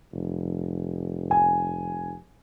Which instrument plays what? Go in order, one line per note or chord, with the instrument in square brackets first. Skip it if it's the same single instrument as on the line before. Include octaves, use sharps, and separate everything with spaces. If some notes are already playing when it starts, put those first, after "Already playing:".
[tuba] F1
[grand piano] G#5